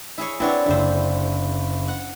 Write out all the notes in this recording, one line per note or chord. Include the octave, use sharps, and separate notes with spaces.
E4 G#4 C#5
C4 D4 E4 B4 C#5 F#5
F#1 D3 E4 C5
F#5